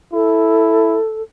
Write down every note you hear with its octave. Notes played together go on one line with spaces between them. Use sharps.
E4 A4